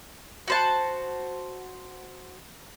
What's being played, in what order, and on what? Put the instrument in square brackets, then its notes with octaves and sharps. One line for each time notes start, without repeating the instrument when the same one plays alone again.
[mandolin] F#4 C5 A5